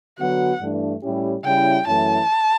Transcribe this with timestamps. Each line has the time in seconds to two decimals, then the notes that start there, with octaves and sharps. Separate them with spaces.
0.19 D3 F#3 B3 F#4 F#5
0.61 G2 E3 A3 D4
1.02 A2 G3 C#4 E4 G4
1.45 C#3 G3 C#4 E4 G5
1.87 F#2 E3 A3 C#4 E4 A5